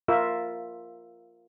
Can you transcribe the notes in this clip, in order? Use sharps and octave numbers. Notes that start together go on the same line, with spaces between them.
F4 A#4 E5